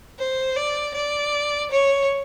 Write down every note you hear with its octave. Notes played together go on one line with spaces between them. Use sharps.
C5
D5
D5
C#5